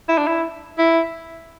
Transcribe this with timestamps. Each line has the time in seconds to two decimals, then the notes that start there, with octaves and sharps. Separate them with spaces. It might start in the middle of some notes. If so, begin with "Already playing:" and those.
0.09 E4
0.18 D4
0.27 E4
0.78 E4